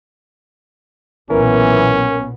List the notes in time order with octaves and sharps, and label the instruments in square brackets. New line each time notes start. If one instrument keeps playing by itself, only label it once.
[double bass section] B1 A#2 B3 [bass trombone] E3 [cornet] C#4 [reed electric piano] A#4